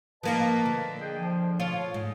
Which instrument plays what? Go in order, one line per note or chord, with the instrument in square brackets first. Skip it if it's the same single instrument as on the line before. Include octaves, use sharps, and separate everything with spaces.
[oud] F3 A#3 F4 [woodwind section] B4 D#5 A5
[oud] D3
[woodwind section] G#4 D#5 G5
F3
[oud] F4 [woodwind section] C#5
[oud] G#2